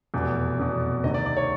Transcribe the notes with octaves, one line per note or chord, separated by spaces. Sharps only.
F1 E2 B2
F1 E2 B2
D2 C3 D#3 D#5
D5
D5
C#5